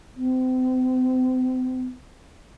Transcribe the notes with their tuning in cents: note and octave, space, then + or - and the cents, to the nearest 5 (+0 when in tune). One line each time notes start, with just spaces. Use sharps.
C4 -35